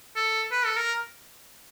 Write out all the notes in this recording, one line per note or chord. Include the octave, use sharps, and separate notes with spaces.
A4
B4
A4
A#4